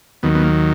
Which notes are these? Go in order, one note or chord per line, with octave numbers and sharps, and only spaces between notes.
D#2 D#3 F#3 B3
B3
A#3